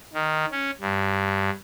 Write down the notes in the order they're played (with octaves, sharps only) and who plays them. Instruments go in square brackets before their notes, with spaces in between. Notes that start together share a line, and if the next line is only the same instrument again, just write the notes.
[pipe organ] D#3
C#4
G2